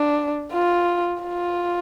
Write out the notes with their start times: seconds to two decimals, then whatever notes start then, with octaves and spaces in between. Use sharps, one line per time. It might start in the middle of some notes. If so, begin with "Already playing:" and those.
Already playing: D4
0.52 F4
1.23 F4